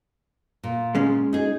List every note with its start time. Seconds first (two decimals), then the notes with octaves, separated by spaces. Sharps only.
0.63 A#2
0.95 G#3 C#4
1.33 D#4 G#4